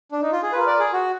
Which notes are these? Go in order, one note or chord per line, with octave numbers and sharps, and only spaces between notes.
D4
D#4
F4
G#4
F4 A#4 B4 F5
D5
G#4
F#4